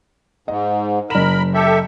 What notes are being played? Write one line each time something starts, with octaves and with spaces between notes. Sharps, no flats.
G#2 D#5
F#1 A#4 B5 E7
G4 A4 E5